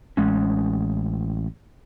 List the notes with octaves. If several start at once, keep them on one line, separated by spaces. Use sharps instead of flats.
A1 G#3 C#4